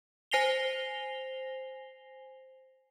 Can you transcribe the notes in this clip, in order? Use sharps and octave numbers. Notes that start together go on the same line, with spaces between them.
C5 G#5 A#6 C7 F7 G7